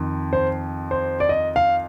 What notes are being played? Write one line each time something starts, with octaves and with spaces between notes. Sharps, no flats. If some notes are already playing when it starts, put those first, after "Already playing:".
Already playing: F2 D#3
C5
C5
D5
D#5
F5